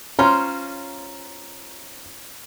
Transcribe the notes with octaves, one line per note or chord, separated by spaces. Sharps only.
C#4 F4 C5 A#5